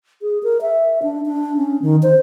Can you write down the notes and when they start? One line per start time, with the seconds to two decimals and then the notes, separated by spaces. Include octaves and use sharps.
0.22 G#4
0.43 A#4
0.62 E5
1.03 D4
1.26 D4
1.57 C#4
1.82 D#3
2.03 C5